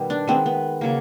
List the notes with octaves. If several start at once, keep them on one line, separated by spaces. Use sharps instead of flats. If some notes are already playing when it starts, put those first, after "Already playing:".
Already playing: B2 D#3 G3 B3
D4
D#3 G#3 B3 C4
B3
C#3 F#3 A#3